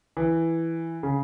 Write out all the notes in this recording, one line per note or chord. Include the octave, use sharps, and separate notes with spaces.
E3
C#3